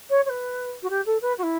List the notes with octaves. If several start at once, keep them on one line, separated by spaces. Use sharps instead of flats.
C#5
C#5
B4
F#4
G4
A4
B4
F#4
E4